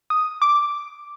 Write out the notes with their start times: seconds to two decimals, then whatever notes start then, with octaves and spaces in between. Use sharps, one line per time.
0.10 D#6
0.42 D6